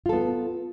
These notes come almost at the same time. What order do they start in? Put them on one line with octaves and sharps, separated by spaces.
F4 A4 B3